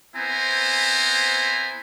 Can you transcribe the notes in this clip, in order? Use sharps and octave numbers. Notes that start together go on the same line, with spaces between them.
B3 C4 E4 C5 G#5 A#5